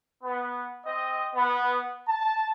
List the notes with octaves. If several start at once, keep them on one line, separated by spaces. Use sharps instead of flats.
B3
C4 D#5
B3
A5